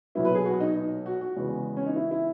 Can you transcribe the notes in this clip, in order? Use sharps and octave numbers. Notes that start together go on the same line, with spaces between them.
B1 A#2 F#3 B3 E4
B4
G#4
F#4
D#4
D#4
F#4
F#4
E2 C#3 G#3 B3
C#4
D#4
E4
E4